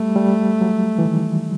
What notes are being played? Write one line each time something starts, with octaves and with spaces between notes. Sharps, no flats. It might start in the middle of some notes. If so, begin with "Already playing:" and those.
Already playing: G3 A3
G3
F#3
E3
D#3